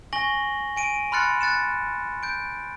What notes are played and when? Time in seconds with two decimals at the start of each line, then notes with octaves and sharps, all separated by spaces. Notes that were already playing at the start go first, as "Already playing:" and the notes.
0.13 G#5 C#6 A#6 F#7 G7
0.76 G#5 D7 D#7
1.12 B5 C6 F6 F#6 A6 C#7
1.41 F#6 A6 C#7 E7
2.23 G6 D7